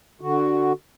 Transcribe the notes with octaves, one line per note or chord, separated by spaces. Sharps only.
D3 F#4